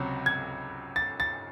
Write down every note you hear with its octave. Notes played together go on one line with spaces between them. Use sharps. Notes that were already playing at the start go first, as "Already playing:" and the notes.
Already playing: C#2 C3 F#3 C#4
G#6
A6
A6